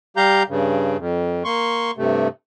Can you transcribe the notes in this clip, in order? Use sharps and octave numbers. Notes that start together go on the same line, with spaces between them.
G3 G4 F5 A#5 G6
G2 C#3
F2
A#3 C6 C#6
G2 C3 A3